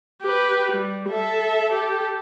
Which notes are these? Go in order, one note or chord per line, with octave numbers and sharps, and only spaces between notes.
G4 B4
G3
A4 E5
G4 A4